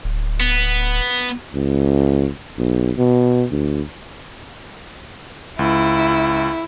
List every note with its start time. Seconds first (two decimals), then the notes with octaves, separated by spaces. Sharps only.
0.04 D1
0.40 B3
1.55 C#2
2.58 B1
2.98 B2
3.51 D2
5.59 C#2 E4